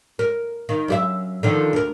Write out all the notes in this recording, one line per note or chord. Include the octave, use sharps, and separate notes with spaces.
A#4
D#3
F#2 G4 E5
D3 D#3 F3
D2 A#4